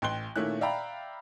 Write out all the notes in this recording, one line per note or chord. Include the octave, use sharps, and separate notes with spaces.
A1 G5 C6 F#6 G7
A#2 D#3 A3 C#4 E4 F#6
D5 E5 F5 G5 A#5 B5